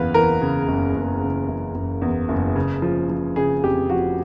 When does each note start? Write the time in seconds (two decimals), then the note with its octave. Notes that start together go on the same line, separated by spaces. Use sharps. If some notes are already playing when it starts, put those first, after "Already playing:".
Already playing: F#1 E2 E3 B4 F5
0.14 E3 A#4
0.41 C#3
0.68 F#1
0.95 F#1
1.22 C#3
1.48 F#1
1.75 F#1
2.02 E2
2.29 F#1
2.56 C#3
2.82 F3
3.10 F3
3.36 C#3 G#4
3.63 F1 G4
3.90 F3 F#4